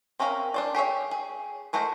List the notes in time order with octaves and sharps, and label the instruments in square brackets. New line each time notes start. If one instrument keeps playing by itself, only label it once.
[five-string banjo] C4 C#4 A#4 E5 F5
D4 C5 D5
G4 G#4 C#5 E5
G#4
G#3 A3 F#4 A#4 C5